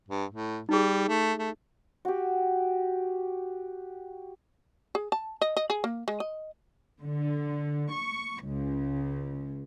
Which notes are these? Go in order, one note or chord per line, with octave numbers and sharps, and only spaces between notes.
G2
A2
G3 D#4 G#4
A3
A3
F#4 G4
G#4
A5
D#5
D#5
G#4
A#3
G#3
D#5
D3
C#6
C#2